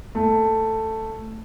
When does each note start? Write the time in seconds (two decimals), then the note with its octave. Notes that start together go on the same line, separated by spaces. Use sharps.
0.15 A3